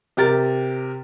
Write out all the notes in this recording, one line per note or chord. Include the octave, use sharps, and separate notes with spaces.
C3 G4 A#4 A6